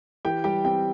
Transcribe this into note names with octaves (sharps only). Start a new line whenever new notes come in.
E3 G4 G5
G3 G4 G5
C4 G4 G5